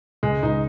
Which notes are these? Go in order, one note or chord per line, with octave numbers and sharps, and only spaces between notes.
C#2 G#3
C#2 D#4